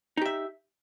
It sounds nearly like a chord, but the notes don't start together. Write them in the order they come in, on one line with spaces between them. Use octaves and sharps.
D#4 G4 E5